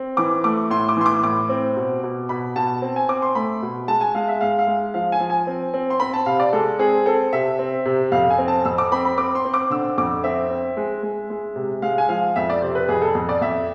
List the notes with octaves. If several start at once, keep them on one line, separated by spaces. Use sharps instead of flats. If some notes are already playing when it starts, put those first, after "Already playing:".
Already playing: C4
E3 D6
A3 D6
A2 C6
D6
E3 C6
D6
A2 D6
C4
B2
B2
B2 B5
B2 A5
C4
G#5
C4 D6
C6
A3 B5
B2
G#3 A5
G#5
G#3 F5
E5
G#2 F5
F5
G#3
F3 F5
G#5
F3
G#5
C4
C4
C6
C4 B5
A5
C3 F5
D5
G#3 A4
C4 G#4
C4 A4
C3 E5
C4
C3
F2 F5
G#5
C4
A5
F2 E6
D6
C4 B5
B5
C4 D6
C6
C4
D6
D3 E6
F2 D6
C4 E5
C4
G#3
G#3
G#3
C3
G#3 F5
G#5
F3 F5
F2 E5
D5
C3 C5
B4
F2 G#4
A4
F2
D5
F2 E5